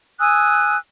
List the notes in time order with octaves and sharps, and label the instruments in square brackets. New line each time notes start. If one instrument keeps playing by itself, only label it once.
[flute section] G#5 D#6 E6 F#6